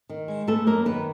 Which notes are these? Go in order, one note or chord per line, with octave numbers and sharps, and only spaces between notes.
D#3
G#3
A3 B3 A4
F#2 A#3 A#4
D#3 B3 B4